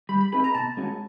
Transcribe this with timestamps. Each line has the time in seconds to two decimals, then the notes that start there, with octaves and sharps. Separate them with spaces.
0.09 G3 B5
0.21 B5
0.32 C4 D#4 G#4 B4 B5
0.44 A#5
0.55 B2 A5
0.77 G#3 C#4 F#4